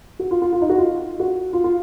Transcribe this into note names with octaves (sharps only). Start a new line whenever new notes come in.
F#4
F4
F4
F4
D#4
F#4
F4
F#4
F4
F4